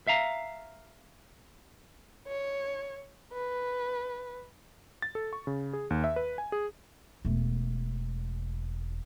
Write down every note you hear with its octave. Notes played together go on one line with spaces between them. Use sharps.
E5 F5 A#5
C#5
B4
A6
A4
C#6
C#3
G#4
D#2
E5
B4
G#5
G#4
E1 A3